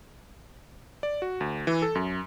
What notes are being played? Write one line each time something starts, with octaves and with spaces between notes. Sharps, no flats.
D5
F#4
D2
E3
A4
F#2